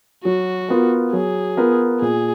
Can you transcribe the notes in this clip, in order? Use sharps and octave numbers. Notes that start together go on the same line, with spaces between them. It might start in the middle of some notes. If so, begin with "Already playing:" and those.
F#3 F#4
B3 F4 A#4
F#3 G#4
B3 F4 A#4
A#2 G#4